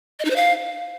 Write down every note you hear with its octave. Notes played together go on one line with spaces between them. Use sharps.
D#5
D#4
C5
F5